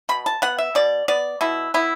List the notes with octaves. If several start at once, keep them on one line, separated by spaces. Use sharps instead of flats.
B2 B5
A5
B3 F#5
E5
B2 D5
B3 D5
B2 E4
B3 E4